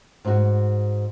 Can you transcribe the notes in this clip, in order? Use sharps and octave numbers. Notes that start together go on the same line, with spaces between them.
G#2 F#4